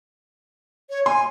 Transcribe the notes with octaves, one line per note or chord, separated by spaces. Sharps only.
C#5
G#5 C6